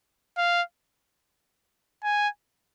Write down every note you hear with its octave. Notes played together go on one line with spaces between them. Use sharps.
F5
G#5